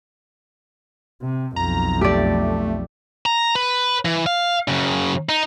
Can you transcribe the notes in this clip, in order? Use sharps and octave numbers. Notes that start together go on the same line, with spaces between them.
C3
B1 F2 A#5
A3 G4 D5
A#5
B4
E3
F5
F#2 C#3
D#4